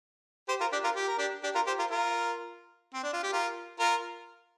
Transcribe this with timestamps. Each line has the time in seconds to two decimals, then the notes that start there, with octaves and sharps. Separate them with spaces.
0.48 G4 C5
0.60 F4 A#4
0.72 D4 G4
0.84 F4 A#4
0.96 G4
1.07 A#4
1.18 D4 G4
1.43 D4 G4
1.55 F4 A#4
1.67 G4 C5
1.79 F4 A#4
1.90 F4 A#4
2.94 C4
3.03 D4
3.13 F4
3.23 G4
3.32 F4 A#4
3.80 F4 A#4